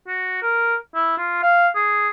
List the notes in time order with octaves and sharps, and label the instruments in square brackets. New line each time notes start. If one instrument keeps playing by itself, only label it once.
[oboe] F#4
A#4
E4
F4
F5
G#4